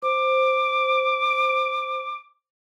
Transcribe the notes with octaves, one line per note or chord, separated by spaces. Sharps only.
C5 D6